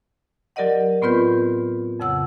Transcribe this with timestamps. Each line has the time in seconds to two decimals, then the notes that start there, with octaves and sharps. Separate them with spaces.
0.56 F#3 G4 A#4 D5 D#5 F#5
1.02 A2 B3 C4 F4 B4 G6
2.00 F2 C#3 F#5 E6